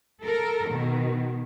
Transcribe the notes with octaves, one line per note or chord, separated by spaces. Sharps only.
A4 A#4
B2 D#3